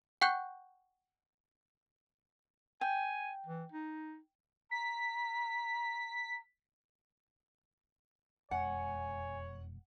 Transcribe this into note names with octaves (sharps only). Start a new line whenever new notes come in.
F#5 G5 C#6 F#6 G6
G5 G#5
E3
D#4
A#5 B6
E1 F2 G#3 C#5 F#5 G#5